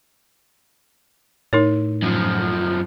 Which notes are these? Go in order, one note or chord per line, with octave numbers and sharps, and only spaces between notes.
A2 D#4 A#4 C#5
F#2 F3